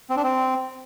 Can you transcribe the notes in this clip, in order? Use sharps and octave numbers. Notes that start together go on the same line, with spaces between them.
C4
D4
C4